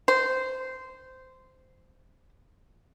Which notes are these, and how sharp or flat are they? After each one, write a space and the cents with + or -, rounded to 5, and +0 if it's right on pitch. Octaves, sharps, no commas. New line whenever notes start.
C5 -15